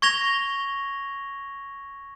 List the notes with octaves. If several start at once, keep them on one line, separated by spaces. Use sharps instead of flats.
C#6 G#6 A#6 F7 G7